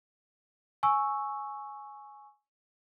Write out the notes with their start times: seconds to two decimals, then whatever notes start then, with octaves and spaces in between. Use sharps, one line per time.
0.83 G#5 C#6 E6